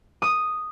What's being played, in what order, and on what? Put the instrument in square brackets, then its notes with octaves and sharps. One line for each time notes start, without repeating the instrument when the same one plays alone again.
[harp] D#6